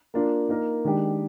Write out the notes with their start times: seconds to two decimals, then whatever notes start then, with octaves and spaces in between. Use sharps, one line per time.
0.14 A#3 D4 F4 A#4
0.49 A#3 D#4 A#4
0.85 D#3 G#3 D4 G4